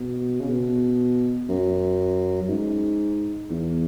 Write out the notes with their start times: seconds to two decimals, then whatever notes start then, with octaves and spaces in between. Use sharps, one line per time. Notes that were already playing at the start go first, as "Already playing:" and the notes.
Already playing: B2
0.40 C#3
0.49 B2
1.49 F#2
2.42 F#2
2.49 G#2
3.50 E2